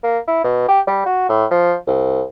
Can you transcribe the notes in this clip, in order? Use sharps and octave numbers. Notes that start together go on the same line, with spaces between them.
A#3
E4
B2
G4
G3
F#4
A2
F3
C2